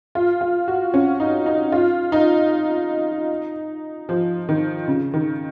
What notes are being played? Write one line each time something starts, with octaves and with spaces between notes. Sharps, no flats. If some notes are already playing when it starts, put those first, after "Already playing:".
F4
F4
F#4
C#4
D#4
D#4
F4
D#4
F3
D#3
C#3
D#3